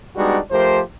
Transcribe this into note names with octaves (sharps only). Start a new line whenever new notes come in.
G3 G#3 B3 D4 D#4 F#4
F3 A3 G4 A#4 C5